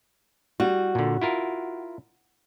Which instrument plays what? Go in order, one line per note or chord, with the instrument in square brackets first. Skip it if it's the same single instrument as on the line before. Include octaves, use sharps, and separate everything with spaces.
[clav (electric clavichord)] G3 [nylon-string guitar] F#4
[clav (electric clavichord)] A#2 D3
E4 F4 A#4